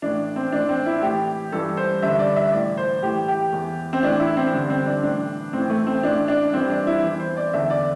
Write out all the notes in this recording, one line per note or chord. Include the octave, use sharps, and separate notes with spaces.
A2 E3 D4
C4
A2 E3 D4
C4
E4
A2 E3 G4
G2 E3 A4
C5
G2 D3 E5
D5
E5
A2 E3 D5
C5
A2 E3 G4
G4
E2 E3
C4
A2 E3 D4
E4
C4
G2 D3
C4
D4
A2 E3 D4
A2 E3 C4
A3
C4
A2 E3 D4
D4
G2 E3 C4
D4
E4
E2 E3
C5
D5
E2 D3 E5
D5